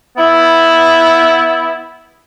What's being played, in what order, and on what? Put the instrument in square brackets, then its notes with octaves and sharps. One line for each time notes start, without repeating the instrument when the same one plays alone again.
[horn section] B3 E4